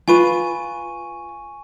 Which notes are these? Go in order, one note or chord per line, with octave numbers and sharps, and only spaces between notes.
F4 B4 G#5 C#6 D#7